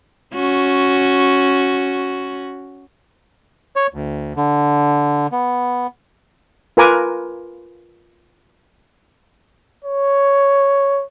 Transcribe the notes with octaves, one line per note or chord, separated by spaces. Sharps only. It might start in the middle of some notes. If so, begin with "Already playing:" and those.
C#4 F#4
C#5
D2
D3
B3
F4 A#4 B4 G#5 A#5 D6
C#5